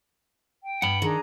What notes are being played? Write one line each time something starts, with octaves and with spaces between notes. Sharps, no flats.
G5
G2 F#5 B5
D#3 D4 G#4 A#5